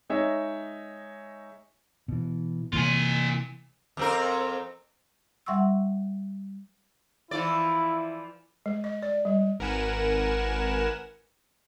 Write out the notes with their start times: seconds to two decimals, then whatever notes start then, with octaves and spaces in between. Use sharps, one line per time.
0.10 G#3 D#4 C#5 E5
2.08 B2 E3
2.73 C3 E3 A#3 F4 G#5
3.97 F2 C4 A#4
5.46 G3 E5 F#5 C6 C#6 E6
7.31 E3 F3 E4 D5
8.66 G#3
8.84 D#5
9.03 D5
9.25 G3
9.59 G#1 A#4 B4 F#5 G#5 E7